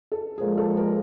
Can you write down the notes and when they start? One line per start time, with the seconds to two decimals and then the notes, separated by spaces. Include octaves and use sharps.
0.12 A4
0.38 A#2 F3 G#3 G#4
0.58 A4
0.77 A#4